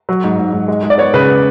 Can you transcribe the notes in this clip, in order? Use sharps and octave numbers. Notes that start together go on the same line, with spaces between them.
F#3
G#2
G#2
G#2
G#3
G#3
D5
B3 C#5
C#3 B4